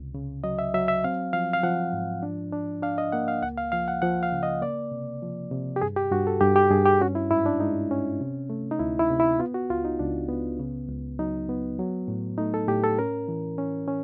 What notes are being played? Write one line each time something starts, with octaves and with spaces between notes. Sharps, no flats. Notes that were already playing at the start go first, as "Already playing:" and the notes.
Already playing: C#2 C3
C#3
F#3 D#5
E5
F#3 E5
E5
C4 F5
F3 F5
F5
F3 F#5
G#2
D4
D4
D4 F5
D#5
A#3 F#5
F5
C#2 F#5
F5
F3 F5
F#5
F3 F#5
F5
C#3
D#5
A#3 D5
C3
F3
C3
G4
G2 G#4
G4
G2 F#4
A4
G2 G4
G4
G2 G#4
G4
C#4 F#4
E4
G#2 E4
D4
G#3 D#4
C#4
C3
A3
D#4
D2 E4
E4
C3
E4
B3 F4
F#4
C#2 F4
D#4
C#2 D4
B3
C#3
C#2
F#3 D#4
B3
F#3
A2
A3 D#4
A4
A2 G4
A4
C#4 A#4
E3
C#4
C#4